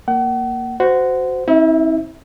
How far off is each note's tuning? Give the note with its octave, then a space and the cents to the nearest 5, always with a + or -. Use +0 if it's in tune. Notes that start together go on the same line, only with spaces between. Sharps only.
A#3 +0 F#5 +40
F#4 +0 C5 -20
C4 +25 E4 -40 E5 +0